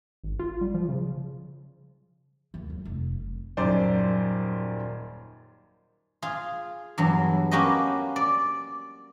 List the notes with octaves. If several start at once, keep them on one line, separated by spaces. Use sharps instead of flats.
G#1
F4
G3
F3
C#3
D#2
F#2
F1
D#1 F#2 C5 D5
F4 G#4
E2 G2 F#3
A#3 C#4 F#4 G4 B4 D#5
D5